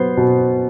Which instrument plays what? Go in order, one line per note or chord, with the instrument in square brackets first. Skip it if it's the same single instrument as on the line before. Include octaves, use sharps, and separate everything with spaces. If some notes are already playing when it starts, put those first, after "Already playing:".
Already playing: [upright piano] F#3 B3 [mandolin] C5
[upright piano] B2